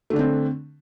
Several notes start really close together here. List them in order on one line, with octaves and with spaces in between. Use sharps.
A3 D3 D4 C4